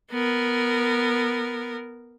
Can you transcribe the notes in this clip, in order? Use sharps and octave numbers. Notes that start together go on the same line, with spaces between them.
B3 A#4